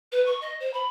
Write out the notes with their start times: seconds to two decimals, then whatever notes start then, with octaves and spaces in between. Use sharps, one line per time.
0.12 B4
0.26 C#6
0.41 D#5
0.60 C5
0.73 B5